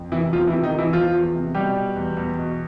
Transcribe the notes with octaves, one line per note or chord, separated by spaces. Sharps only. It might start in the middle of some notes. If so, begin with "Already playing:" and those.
Already playing: F2
C3 E3 E4
E2 F3 F4
E3 E4
C3
D#3 D#4
F3
E3 E4
E2 F3 F4
E2
C3
B2 G3 G4
B2
E2
E2
B2